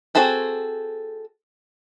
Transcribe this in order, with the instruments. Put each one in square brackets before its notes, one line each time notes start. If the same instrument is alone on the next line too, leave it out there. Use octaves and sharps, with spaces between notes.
[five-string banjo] C4 F#4 G#4 A4 C5